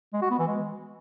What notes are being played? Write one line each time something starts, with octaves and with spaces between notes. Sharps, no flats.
G#3
F#4
B3
E3
G#3